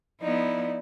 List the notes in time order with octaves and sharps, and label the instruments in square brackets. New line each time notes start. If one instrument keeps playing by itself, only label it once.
[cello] F3 B3 [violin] D#4 E4 [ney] D5